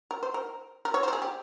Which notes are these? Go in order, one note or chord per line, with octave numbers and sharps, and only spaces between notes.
A#4
C5
A#4
A#4
C#5
C5
A#4
G#4
G4